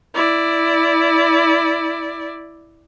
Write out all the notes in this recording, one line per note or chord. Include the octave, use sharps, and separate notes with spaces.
E4 D5